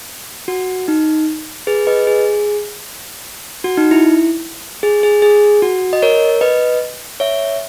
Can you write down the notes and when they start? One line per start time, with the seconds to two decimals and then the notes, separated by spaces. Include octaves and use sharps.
0.48 F#4
0.88 D#4
1.67 G#4 B4
1.87 B4 D#5
2.07 G#4
3.64 F#4
3.77 D#4
3.91 E4
4.83 G#4
5.03 G#4
5.22 G#4
5.62 F#4
5.93 D#5
6.02 A#4 C#5
6.41 B4 D#5
7.20 C#5 E5